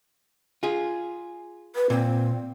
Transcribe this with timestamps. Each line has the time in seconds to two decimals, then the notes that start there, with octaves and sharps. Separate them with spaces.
0.63 F4 G#4
1.75 B4
1.90 A#2 C4